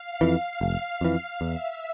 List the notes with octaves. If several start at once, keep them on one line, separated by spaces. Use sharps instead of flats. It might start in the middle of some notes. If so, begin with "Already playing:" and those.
Already playing: F5
F2 E3
F1
F2 E3
E2 E5